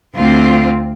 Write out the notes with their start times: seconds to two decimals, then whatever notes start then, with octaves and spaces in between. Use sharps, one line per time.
0.15 D2 C4 F4